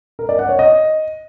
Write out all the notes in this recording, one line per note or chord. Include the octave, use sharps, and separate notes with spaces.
A#4
D5
F#5
C#5
D#5